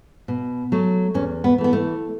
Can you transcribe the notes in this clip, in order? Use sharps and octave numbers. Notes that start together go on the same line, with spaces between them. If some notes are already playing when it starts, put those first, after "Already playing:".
B2
F#3 A3
E2 C#4
B3
E3 A3
B3
A3